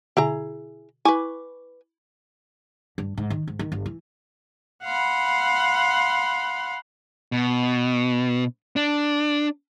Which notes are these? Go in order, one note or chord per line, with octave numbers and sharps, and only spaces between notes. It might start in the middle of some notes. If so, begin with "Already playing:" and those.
B2 D3 E4 G#4 A#5
E4 B4 G#5 C#6 D6
G2
G#2
D#3
G#2
D#3
G1
E3
F5 F#5 B5 C6
B2
D4